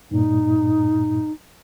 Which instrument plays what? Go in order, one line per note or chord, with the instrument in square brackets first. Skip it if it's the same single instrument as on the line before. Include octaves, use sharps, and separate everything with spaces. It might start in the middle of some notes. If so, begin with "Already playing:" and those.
[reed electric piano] G2 A#2 [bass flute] D#4